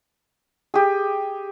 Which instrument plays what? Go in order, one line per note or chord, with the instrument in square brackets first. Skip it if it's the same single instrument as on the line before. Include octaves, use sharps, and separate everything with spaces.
[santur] G4 G#4